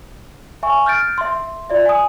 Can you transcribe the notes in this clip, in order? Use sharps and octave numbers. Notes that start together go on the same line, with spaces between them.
E5 G#5 C#6
F6 G6 A6 D7
E5 C6
F4 D5 E5
G#5 D#6